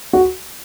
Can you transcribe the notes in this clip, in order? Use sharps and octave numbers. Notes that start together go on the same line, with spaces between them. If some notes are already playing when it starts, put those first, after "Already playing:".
F#4